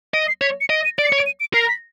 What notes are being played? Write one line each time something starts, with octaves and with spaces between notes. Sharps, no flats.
D#5 D7
C7
C#5 B6
C#7
D#5 D7
D#7
D5 D7
C7
C#7
C#5
D7
D#7
D7
A#4 C7
A#6
B6